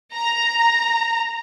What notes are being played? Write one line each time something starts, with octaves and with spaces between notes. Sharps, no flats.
A#5